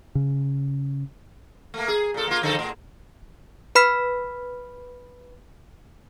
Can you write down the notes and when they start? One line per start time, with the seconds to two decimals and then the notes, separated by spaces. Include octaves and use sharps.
0.15 C#3
1.74 A3 A#3
1.88 G#4
2.14 A#2 A4
2.27 A#3 F4
2.41 F2 D3 A4
2.59 A2
3.75 B4 B5 F6 B6